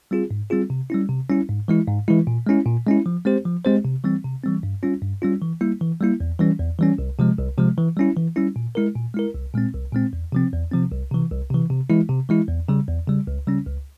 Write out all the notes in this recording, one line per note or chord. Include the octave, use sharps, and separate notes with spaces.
G3 C4 F4 G#4
G#2
G3 C4 F4 G#4
C3
G3 C#4 E4
C3
G3 C#4 E4
G#2
E3 G#3 E4
G#2
E3 G#3 E4
A#2
G#3 C#4 E4
A#2
G#3 C#4 E4
F3
G#3 C4 G4 C5
F3
G#3 C4 G4 C5
C3
E3 G3 C4
C3
E3 G3 C4
G2
G3 C#4 F4
G2
G3 C#4 F4
E3
G3 A#3 E4
E3
G3 A#3 E4
E2
E3 G3 C#4
E2
E3 G3 C#4
C2
C3 F3 G#3
C2
C3 F3 G#3
E3
G3 C#4 E4
E3
G3 C#4 E4
A#2
G#3 E4 A#4
A#2
G#3 E4 A#4
C2
A#2 G#3 C4
C2
A#2 G#3 C4
E2
C3 F3 C4
E2
C3 F3 C4
C2
C3 E3
C2
C3 E3
C3
E3 G#3 E4
C3
E3 G#3 E4
E2
C#3 G3
E2
C#3 G3
C#2
C#3 G3 C#4
C#2